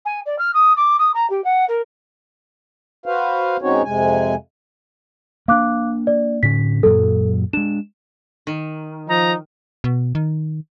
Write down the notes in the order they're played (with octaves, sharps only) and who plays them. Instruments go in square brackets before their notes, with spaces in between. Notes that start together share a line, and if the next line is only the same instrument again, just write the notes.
[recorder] G#5
D5
F6
D#6
D6
D#6
A#5
G4
F#5
A#4
[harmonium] F#4 B4 C5 F5
G#2 C4 C#4 D#4 F#4 C#5
F2 C3 G#3 G#5
[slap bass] A#3 D4 [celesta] F5 D6 F#6
[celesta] D5
[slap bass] A2 D3 C#4 [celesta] B6
[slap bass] F#2 A#2 F#3 [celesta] A4
[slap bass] G#3 D4 [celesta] E7
[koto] D#3
[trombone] F3 [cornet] D#4 [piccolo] A#5
[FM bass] B2
D#3